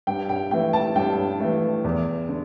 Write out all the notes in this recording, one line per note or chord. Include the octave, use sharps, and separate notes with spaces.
G2 G5
G5
E3 A3 G5
A5
G2 G5
E3 A3
E2
D3